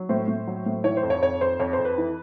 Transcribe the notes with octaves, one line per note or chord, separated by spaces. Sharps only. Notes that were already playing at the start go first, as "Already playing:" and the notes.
Already playing: F#3
A2 C5
A2
F#3
A2
E3 C#5
C5
F2
C#5
F2 C#5
F2 C5
F2 C#5
C5
F2
B4
E3